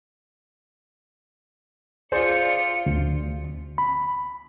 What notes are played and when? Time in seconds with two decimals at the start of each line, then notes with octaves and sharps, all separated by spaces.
2.12 F4 G#4 C5 D5 C#7
2.86 D2
3.78 B5